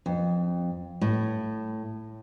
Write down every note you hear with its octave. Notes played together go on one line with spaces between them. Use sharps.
F2
A2